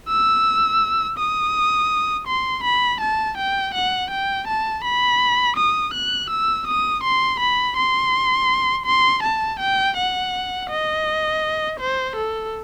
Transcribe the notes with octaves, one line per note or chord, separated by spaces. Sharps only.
E6
D#6
C6
B5
A5
G5
F#5
G5
A5
B5
D#6
F#6
E6
D#6
C6
B5
C6
C6
A5
G5
F#5
D#5
C5
A4